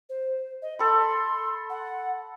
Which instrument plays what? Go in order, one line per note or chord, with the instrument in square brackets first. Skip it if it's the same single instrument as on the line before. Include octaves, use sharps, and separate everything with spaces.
[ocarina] C5
D#5
[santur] A4 B5 [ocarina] C6
[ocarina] F#5